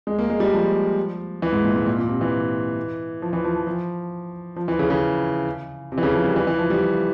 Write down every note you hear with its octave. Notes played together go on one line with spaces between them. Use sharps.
G#3
A#3
G#3
G3
F3
E3
G#2
A#2
G#2
A#2
A#2
C3
E3
F3
E3
F3
F3
F3
F3
E3
C#3
C#3
C3
E3
C#3
F3
G3
E3
E3
F3
G3